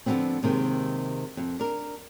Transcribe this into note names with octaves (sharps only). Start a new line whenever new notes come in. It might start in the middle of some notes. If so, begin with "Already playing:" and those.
D3 F3 F#3 G#3 B3 C4
D#2 C3 D#3 G#3
F2
D4 A#4